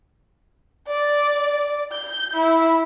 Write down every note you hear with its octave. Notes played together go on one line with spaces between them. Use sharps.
D5
G6
E4